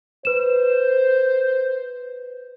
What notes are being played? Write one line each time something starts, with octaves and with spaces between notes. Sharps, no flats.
B4 C5 E7